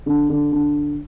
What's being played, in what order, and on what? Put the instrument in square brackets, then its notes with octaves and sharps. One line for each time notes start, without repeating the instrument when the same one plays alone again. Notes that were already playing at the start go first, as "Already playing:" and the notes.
[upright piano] D3
D3
D3